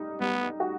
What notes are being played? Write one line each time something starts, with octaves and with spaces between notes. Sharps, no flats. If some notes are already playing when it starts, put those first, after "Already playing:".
Already playing: G3 D#4
G3 B3
F#4